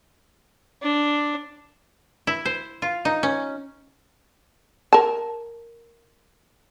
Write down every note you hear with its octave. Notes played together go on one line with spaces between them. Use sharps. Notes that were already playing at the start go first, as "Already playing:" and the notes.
D4
E4
C5
F4
D#4
C#4
A#4 A5